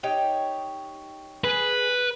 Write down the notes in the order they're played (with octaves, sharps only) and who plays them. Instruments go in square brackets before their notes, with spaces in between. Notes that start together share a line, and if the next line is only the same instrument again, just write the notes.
[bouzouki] D#4 G4 C#5
[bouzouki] G#4 [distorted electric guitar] B4